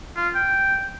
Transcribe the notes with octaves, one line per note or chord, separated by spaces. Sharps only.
F4
G5